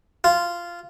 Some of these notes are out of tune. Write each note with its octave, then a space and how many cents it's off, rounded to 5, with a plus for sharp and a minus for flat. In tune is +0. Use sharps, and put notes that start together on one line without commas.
F4 -10